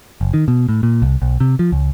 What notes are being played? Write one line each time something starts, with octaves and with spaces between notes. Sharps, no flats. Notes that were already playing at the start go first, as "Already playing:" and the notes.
F#1
D#3
B2
A2
A#2
C2
B1
C3
F3
C#2